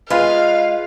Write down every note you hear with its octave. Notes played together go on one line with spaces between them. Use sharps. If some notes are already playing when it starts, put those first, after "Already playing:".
G#3 F4 B4 F5